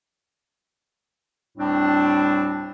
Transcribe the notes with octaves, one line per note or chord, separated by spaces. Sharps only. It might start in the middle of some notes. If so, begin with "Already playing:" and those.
D2 A2 G3 C4 D4